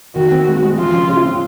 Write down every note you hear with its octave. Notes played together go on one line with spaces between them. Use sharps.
D#3 F#4
C4
G#3
G#3
F3 F4
C#3
C#3
C4